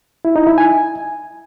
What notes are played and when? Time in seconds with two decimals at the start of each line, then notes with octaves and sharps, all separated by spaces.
0.25 E4
0.36 D#4
0.47 E4
0.58 G#5